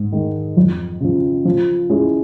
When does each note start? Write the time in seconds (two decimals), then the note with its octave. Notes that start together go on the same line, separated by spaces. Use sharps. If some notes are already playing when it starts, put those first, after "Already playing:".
Already playing: G#2
0.12 D#3 G#3
0.57 F2
1.01 C#3 F3
1.45 F3
1.89 G#3 C#4 E4 G#4